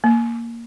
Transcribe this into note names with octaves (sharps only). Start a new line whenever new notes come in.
A#3